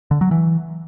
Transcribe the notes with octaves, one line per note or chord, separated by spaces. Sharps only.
D3
F#3
E3